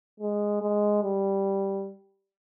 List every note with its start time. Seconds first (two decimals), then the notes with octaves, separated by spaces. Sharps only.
0.20 G#3
0.62 G#3
1.03 G3